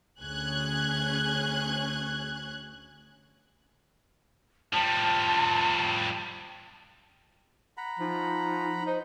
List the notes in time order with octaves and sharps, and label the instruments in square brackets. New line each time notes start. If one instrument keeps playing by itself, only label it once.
[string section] D2 C#4 G#4 F#6 G#6
[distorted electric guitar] F3 G3 [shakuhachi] A5
[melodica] F#5 A#5 B5
[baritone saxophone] F3 [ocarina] D#4
[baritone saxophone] D#4 [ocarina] C5